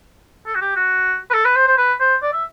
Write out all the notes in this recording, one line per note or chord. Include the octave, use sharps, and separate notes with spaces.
A4
F#4
G4
F#4
B4
A4
B4
C5
C5
B4
C5
D5
E5